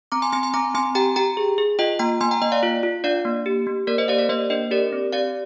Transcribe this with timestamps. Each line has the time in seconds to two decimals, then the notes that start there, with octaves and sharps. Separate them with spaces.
0.12 C4 A#5 D6
0.22 G#5 C6
0.32 C4 G#5 C6
0.43 G#5 C6
0.54 C4 A#5 D6
0.74 C4 G#5 C6
0.95 G4 G5 A#5
1.16 G4 G5 A#5
1.37 G#4
1.58 G#4
1.79 F4 D#5 G5
1.99 A#3 G5 A#5
2.21 A#3 G#5 C6
2.31 G5 A#5
2.41 A#3 D#5 G5
2.52 D5 F5
2.63 F4
2.83 F4
3.04 D4 D5 F5
3.25 A#3
3.46 G4
3.67 A#3
3.87 A#3 A#4 D5
3.98 C5 D#5
4.08 G4 D5 F5
4.19 A#4 D5
4.29 A#3 C5 D#5
4.50 D4 C5 D#5
4.71 G4 A#4 D5
4.92 C4
5.13 G4 D5 F5